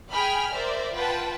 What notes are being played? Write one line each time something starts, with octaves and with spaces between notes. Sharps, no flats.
G#4 G5 G#5 B5 F6
A#4 C5 D5 E5
F4 B4 F#5 G5 A5